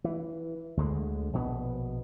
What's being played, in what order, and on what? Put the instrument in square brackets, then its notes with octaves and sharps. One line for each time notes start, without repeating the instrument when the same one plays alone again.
[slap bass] E3
D2 D3 G#3
A#1 B2 B3